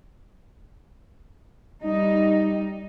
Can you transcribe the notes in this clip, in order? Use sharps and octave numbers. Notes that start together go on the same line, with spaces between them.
G3 D#4